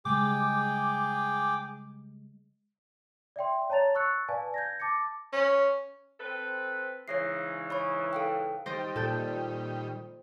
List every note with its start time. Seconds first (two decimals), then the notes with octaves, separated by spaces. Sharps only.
0.05 C#3 G3 G#3 G#4 G5 D6
3.36 D5 E5 G5 C6
3.70 C#5 A5 A#5 A6 F7
3.95 C#6 E6 F#6 A6 C#7
4.28 B4 D5 F5 G#5 A5
4.54 G6 G#6 A#6
4.80 A5 D6 A6 A#6 C#7
5.33 C#4
6.19 C4 A4 B4
7.08 G#2 C#3 E3 C#5 A#6 C7
7.70 C#5 B5 C#6
8.13 A4 F5 G5
8.66 D#3 G3 C5 D#5 A6 A#6 D7
8.96 A#2 A4 G5 G6